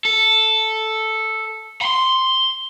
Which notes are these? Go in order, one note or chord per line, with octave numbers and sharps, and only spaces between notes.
A4
B5 C6